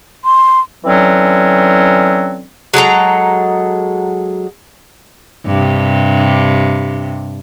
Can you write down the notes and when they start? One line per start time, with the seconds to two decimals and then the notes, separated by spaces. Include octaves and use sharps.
0.25 C6
0.85 D3 E3 F#3 C4 C#4
2.74 F#3 G#3 A4 A#5
5.46 G2 C3